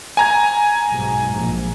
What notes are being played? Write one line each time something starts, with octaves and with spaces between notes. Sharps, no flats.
G#5 A#5 G#6
B1 G#2
A#1